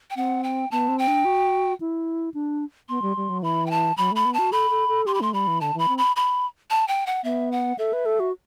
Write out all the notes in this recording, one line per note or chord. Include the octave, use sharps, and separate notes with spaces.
G5
C4 F#5
G5
B3 A5
C4
G5
D4
F#4
E4
D4
B3 C6
G3
G3
F#3
E3 B5
G5
A5
F#3 B5
A3 B5
B3
F#4 A5
A4 B5
A4
A4
G4 C6
B5
A3 C6
G3 B5
E3
D3 A5
E3 B5
C4
B5
B5
A5
G5
F#5
B3 E5
F#5
A4 E5
B4
A4
F#4